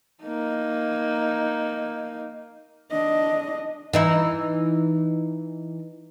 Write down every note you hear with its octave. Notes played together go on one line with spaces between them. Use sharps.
A#3 D#4
D4 D#5
E3 D#4 E4